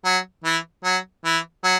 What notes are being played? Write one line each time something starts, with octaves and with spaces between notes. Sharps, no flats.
F#3
E3
F#3
E3
F#3